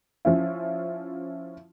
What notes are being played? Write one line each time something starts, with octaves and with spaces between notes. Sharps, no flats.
F3 C#4 E4